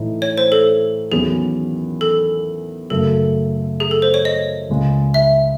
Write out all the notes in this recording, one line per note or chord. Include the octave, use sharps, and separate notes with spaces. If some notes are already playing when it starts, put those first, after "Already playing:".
Already playing: A2 E3 A3 D#4
C#5
C5
A4
E2 D#3 F#3 C#4 G#4
A4
F#2 C#3 F#3 A3 A4
G#4
A4
C5
C#5
D#5
C#2 C#3 G#3
E5